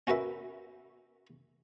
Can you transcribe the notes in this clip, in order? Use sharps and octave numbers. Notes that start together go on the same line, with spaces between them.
C#4 F#4 A#4 B4 E5